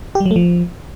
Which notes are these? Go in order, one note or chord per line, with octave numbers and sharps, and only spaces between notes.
G4
G3
F#3
A3
F3